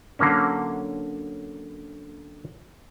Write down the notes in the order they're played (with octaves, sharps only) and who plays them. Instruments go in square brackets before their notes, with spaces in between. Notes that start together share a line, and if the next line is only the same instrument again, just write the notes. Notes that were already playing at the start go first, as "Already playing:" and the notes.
[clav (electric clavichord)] D3 F#3 A#3 C#4